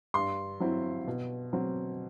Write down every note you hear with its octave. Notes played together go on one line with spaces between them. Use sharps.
G2 C6
F#3 C4 E4
B2
F#3 C4